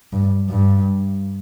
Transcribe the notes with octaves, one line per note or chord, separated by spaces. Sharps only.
G2
G2